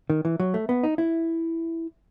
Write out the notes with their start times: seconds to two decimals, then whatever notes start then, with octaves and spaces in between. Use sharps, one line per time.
0.10 D#3
0.25 E3
0.40 F#3
0.54 A3
0.69 B3
0.83 D#4
0.98 E4